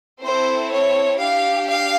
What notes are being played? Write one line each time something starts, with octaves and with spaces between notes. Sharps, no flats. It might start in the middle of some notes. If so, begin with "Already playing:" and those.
C4 E4 A4 C5
C#5
D4 G4 F5
F5